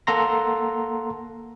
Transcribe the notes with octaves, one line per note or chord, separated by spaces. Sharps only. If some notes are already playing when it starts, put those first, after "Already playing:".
A#3 A4 F#5 A#5 C6 A#6